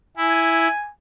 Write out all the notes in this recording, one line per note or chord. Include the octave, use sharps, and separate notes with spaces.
E4 G#5